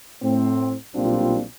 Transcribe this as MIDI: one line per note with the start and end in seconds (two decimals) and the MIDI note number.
0.23 0.74 45
0.23 0.74 60
0.95 1.42 35
0.95 1.42 46
0.95 1.42 55
0.95 1.42 60
0.95 1.42 62
0.95 1.42 65